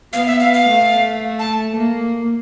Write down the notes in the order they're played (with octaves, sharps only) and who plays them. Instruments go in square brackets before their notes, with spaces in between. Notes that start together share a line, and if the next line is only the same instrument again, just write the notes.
[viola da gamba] B3 [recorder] F5
[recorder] E5
F5
F5
[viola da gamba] A3
[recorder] A5
[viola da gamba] A#3